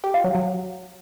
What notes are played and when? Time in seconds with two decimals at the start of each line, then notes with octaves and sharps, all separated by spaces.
0.04 G4
0.14 F4
0.24 F#3
0.35 F#3